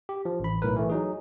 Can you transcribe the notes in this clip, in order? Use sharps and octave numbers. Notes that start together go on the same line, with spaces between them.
G4
F3
A1 B5
B1 A2 A#4 B4
E3 A3
F#3 D#4 G#4